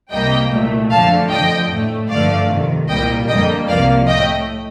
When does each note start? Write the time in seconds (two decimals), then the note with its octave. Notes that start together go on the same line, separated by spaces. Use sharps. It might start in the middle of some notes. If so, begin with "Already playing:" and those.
0.11 C2 C3 G3 A#3 D#5 G5
0.51 C2 A#2 A3
0.91 F2 D3 F3 A3 F5 A5
1.30 F2 D3 F3 D#5 G5
1.70 A2 A3
2.10 G2 D3 F3 A3 D5 F5
2.49 F2 C3 D#3
2.88 C2 A#2 G3 A#3 D#5 G5
3.28 F2 D3 G3 A#3 D#5 G5
3.68 C2 C3 F3 A#3 D5 F5
4.07 A2 A3 D#5 G5